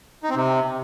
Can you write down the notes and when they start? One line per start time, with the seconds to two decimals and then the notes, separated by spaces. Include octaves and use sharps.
0.23 D#4
0.30 C4
0.36 C3